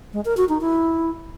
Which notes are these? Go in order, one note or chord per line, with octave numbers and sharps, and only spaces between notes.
G#3
A#4
F#4
D#4
E4